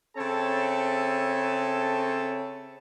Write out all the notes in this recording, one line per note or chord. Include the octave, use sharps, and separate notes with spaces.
C#3 C4 A4 C#5 E5 A5